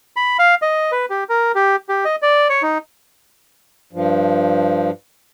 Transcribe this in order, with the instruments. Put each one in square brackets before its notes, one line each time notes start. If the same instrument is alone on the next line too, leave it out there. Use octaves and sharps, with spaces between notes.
[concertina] B5
F5
D#5
B4
G4
A#4
G4
G4
D#5
D5
C#5
D#4
[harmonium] G2 F3